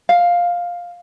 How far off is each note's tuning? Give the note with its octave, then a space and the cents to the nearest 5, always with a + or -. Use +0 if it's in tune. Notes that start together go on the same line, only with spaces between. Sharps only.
F5 +10